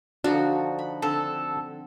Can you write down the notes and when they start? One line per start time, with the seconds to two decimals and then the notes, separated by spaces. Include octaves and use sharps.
0.24 D3 F3 D4 D#4 F#4
0.79 B5
1.02 D3 C4 A4